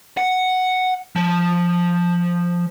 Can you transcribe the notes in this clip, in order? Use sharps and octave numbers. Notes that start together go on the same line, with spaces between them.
F#5
F3